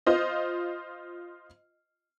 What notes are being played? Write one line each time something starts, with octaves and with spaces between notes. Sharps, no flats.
F4 C5 D#5